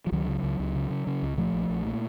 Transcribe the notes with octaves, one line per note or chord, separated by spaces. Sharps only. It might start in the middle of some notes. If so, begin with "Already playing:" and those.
F3
C#2 D#3 F#3
C#3
C#2
C#2
C#3
C#3
C#3
C#2
A#2 F3 A3
A#1
A#1
A#2